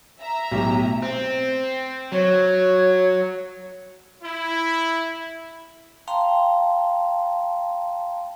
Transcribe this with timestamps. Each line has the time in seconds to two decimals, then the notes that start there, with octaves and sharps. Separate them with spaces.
0.21 E5 A#5
0.52 B1 A2 G4
1.02 C4
2.12 F#3 C#5
4.22 E4
6.08 F5 G5 A5 A#5 C6